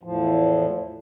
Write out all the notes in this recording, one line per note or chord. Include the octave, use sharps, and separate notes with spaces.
E2 A2 F3